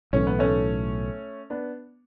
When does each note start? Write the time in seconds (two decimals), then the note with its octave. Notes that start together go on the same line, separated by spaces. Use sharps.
0.13 B1 A2 E3 C#4
0.27 B3
0.39 A3 C#4
1.50 B3 D4